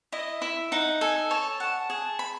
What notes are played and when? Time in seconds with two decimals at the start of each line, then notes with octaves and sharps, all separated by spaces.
0.12 E4 D#5
0.41 E4 E5
0.72 D#4 F#5
1.01 A4 G#5
1.30 C#5 A5
1.60 F#5 A5
1.90 G#4 A5
2.19 B5